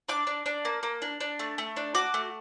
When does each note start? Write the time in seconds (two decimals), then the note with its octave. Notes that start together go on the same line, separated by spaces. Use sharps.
0.09 D4 D6
0.27 D4
0.46 D4
0.65 A#3
0.83 A#3
1.02 D4
1.20 D4
1.39 A3
1.58 A3
1.76 D4
1.95 F#4 D6
2.14 A3